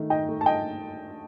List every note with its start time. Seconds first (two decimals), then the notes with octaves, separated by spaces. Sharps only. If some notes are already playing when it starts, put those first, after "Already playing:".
Already playing: D#3 A3
0.10 D#4 D#5 G5
0.29 A3
0.41 A5
0.46 D#5 G5